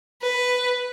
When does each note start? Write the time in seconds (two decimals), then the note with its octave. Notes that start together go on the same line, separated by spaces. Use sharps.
0.22 B4